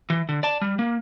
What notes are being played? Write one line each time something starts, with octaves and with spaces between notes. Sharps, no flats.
E3
D3
D5 A5
G3
A#3